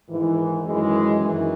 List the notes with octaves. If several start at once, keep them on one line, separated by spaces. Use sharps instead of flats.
G#2 D#3 E3
F#2 D#3 E3 G#3
F#2 D#3 E3